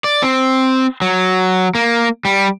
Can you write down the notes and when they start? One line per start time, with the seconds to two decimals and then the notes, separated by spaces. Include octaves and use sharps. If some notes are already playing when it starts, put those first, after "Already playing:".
0.04 D5
0.23 C4
1.02 F#3
1.75 A#3
2.25 G3